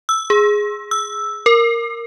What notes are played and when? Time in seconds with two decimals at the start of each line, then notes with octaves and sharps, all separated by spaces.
0.09 E6
0.30 G#4
0.91 E6
1.46 A#4